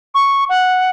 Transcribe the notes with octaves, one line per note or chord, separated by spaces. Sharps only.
C#6
F#5